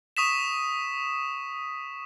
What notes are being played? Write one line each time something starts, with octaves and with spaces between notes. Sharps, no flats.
C#6 D#6 B6 E7